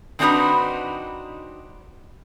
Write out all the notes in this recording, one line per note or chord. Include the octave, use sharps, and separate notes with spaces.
D#3 C4 D4 D#4 F#4 B4